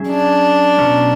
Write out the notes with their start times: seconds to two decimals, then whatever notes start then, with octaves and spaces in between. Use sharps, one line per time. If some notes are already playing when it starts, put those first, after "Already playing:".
Already playing: F#3 C#4 G#4 E5
0.09 D4
0.79 B2 F#3 C#4